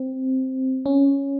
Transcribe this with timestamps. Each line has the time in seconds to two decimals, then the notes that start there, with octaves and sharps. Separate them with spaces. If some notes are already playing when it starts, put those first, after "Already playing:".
Already playing: C4
0.86 C#4